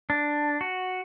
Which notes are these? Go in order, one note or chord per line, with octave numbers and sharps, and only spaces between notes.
D4
F#4